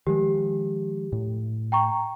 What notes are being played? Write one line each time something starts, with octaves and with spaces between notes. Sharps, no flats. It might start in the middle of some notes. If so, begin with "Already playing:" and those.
D#3 F3 G#3 G4
A2
G5 A#5 C#6